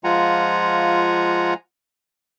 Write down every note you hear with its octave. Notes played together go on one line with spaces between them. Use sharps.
F3 G#3 F4 F#5 G#5 A#5